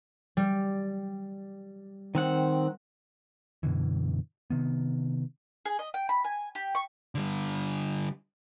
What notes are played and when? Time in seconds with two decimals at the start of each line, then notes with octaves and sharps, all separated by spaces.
0.37 G3
2.15 D#3 C4 F#5
3.63 F#2 B2 D3 E3
4.50 C3 D#3 B3
5.65 G#4
5.79 D#5
5.94 G5
6.09 B5
6.24 G#5
6.55 G4
6.75 C#6
7.15 D3 G3